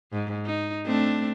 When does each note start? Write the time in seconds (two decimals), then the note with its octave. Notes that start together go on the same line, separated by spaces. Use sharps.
0.13 G#2
0.46 D#4
0.86 A3 C4 D4